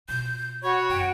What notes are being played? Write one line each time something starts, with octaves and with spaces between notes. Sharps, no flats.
B2 F4 G6
F#4 C#5 B5
F#2 C4 G5